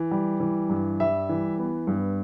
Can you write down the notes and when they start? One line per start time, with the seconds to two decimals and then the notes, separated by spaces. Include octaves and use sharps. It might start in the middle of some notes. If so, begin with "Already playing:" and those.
Already playing: E3
0.11 G3
0.40 E3
0.69 G2
1.00 G3 E5
1.29 E3
1.58 B3
1.87 G2